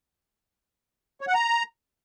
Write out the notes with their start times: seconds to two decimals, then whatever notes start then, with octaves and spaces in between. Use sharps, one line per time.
1.21 C#5
1.28 F#5
1.34 A#5